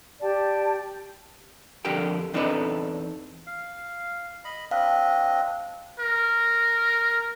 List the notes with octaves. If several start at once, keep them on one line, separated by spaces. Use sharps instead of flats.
G4 D5 G5 A5
F2 D3 G4 A#4 G5
E2 C4 D4 D#4 A4 B4
F5
D#5 B5
C4 D4 D#5 F5
A#4